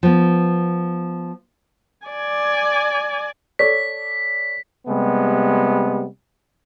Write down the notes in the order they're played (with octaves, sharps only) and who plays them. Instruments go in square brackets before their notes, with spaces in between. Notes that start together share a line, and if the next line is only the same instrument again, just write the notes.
[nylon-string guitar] F3 B3
[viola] D5 G#5
[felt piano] A4 C#5 D5 [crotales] B6
[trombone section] C3 G3 G#3 B3